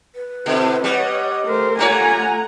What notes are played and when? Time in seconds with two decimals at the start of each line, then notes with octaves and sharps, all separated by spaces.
0.15 B4
0.46 B2 D3 C4 E4
0.84 G3 C#5 D#5 F#5
1.46 A3 A#4 C5
1.79 G3 A3 F4 F#4 C#5 F#5 G#5 A#5